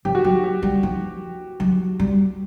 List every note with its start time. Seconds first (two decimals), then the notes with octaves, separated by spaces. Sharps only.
0.05 F3 G4
0.15 F#4
0.25 F#3 G4
0.44 G4
0.62 G3
0.83 F3
1.60 F#3
2.00 G3